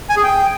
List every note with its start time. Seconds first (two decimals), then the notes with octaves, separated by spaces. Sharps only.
0.10 G#5
0.17 G#4
0.24 G5